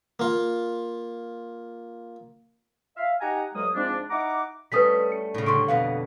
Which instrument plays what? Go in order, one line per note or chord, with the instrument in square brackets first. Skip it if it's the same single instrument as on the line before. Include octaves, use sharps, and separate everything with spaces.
[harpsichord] A#3 F4
[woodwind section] E5 F5
D#4 G4 F#5 G#5 A#5
D2 G2 F#3 G#3 A#3 D#6
G#2 F3 G#3 C4 D4
D#4 E4 F#5 A#5 D6
[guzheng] G3 A3 C#4 [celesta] B4 D#6 B6
[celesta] C#7
[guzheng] A2 C#3
[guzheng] D3 G3 [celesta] C6 C#6 D7
[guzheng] F2 B2 F#5 [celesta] F5